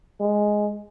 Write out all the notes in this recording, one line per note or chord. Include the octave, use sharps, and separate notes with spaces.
G#3